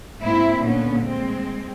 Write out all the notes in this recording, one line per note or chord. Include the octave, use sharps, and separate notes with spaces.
G#2 A#3 C4 E4
A#2 D3 B3 C#4
G#3 C4